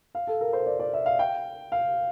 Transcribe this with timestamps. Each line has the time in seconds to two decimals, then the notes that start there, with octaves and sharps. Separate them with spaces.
0.15 F5
0.27 A4
0.41 A#4
0.53 C5
0.66 D5
0.79 D5
0.93 E5
1.06 F5
1.19 G5
1.72 F5